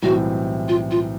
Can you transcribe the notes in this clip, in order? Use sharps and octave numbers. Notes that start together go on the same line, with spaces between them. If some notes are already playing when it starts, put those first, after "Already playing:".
B1 A2 E3 G3 C4 F#4
F4
F4